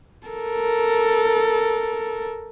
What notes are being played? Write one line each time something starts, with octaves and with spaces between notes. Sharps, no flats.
A4 A#4